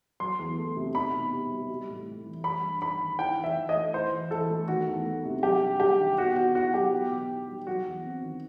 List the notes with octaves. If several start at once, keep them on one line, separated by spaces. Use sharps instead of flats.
F#3 C6
E2
A3
C3
D#4 B5
B2
G4
G3
G3
A2
A2
E3
G3 B5
G2
D#4 B5
D#3
E4 G5
E3
E5
E3
D#5
A3
E4 C5
E3
E3 A4
A3
D#3 F#4
E2
A3
C3
F#3 G4
G2
G2 G4
D#3
B3 F#4
B2 F#4
E4 F#4
F#3 G4
B3
B2
D#4
G3
F#3 F#4
E2
C4
D#3